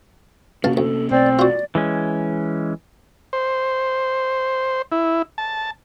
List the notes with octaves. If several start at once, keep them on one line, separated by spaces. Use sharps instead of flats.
C#2 C3 A#3 C#4 F#4 F5 A5
D2 A4
B1 B2 A3 C4 D5
F4 F#4 D5
E3 G#3 C#4
C5
E4
A5